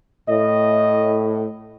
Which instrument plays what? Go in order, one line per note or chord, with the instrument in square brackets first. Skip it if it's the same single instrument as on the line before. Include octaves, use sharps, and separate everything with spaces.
[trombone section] A2 [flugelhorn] D#5